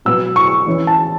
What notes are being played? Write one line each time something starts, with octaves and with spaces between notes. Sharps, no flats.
B2 F#3 B3 E6
C#6
E3 C#4 E4
A5